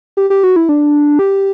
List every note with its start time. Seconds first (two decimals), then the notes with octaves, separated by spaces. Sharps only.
0.17 G4
0.30 G4
0.44 F#4
0.56 E4
0.69 D4
1.19 G4